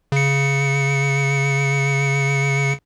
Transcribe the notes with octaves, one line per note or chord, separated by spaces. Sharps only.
C#3 C#7